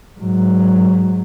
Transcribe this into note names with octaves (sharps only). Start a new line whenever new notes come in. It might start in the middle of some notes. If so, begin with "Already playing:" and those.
G#2 F#3